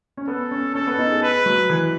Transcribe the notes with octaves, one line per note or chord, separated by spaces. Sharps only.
C#4
B3 A4
C#4
C#4 A4
B3
D#4
G#4
B4
F#3
E3